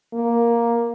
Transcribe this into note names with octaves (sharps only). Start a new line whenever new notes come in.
A#3